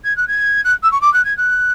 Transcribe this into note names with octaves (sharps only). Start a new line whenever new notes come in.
G#6
F#6
G#6
F#6
E6
C#6
D6
F#6
G#6
F#6